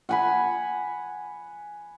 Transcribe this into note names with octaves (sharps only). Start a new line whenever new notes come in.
F#5 G#5 B5